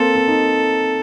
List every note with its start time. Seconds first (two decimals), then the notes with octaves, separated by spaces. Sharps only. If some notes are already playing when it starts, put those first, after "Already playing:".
Already playing: A#3 C4 A4
0.15 C4
0.28 D#4